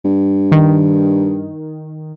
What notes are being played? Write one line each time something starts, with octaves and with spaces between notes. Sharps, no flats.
G2
D#3